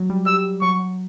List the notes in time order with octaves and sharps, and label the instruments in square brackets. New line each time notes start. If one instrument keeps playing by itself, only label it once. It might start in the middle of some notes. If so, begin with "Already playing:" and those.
Already playing: [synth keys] F#3
G3
[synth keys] G3 [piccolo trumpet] E6
[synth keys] F#3 [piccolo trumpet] C#6
[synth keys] F#3